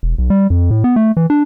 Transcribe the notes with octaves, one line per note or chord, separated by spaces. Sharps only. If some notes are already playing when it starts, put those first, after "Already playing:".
E1
B1
G3
F2
A2
B3
A3
E3
D4